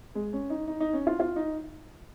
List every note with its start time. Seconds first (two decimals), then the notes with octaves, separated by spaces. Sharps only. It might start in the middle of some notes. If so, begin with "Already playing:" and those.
0.15 G#3
0.33 C#4
0.50 D#4
0.68 D#4
0.80 D#4
0.93 C#4
1.07 F4
1.20 F4
1.36 D#4